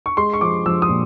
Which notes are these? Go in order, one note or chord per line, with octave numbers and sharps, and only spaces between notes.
C#6
G#3 C6
C#6
F3 D6
F3 E6
D#6
A#2